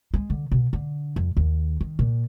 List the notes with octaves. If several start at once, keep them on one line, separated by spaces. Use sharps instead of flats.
G#3
D3
B2
D3
F2
D#2
D#3
A#2